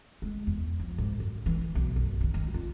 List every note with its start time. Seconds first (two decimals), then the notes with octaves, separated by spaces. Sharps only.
0.22 G#3
0.47 E2
0.80 F3
0.98 G#2
1.20 F#2
1.46 E3
1.75 B1
1.96 F#2
2.21 D#3
2.34 D#3
2.54 F4